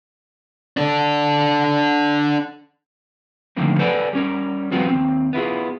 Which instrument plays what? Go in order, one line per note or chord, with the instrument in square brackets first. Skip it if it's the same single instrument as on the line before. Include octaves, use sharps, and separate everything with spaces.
[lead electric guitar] D4 A4
[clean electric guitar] D3 D#3 F3 A3 A#3 C4
A4 B4 C5 D5 F#5 G#5
G3 C#4 A#4
F3 G3 B3 C4 F4 F#4
D#2 C4
B3 E4 F4 G#4